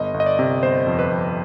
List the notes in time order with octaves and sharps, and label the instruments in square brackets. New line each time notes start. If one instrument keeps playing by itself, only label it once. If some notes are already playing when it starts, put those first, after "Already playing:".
Already playing: [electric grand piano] G1 D#5
G1
D#5
D5
C3
G1 C5
F2
B4
F2